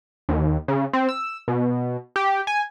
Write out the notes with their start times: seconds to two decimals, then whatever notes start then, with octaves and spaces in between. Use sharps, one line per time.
0.29 D#2
0.68 C#3
0.93 C4
1.09 E6
1.48 B2
2.16 G4
2.47 G#5